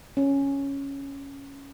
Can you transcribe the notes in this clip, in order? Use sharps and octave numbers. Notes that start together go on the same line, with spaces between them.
C#4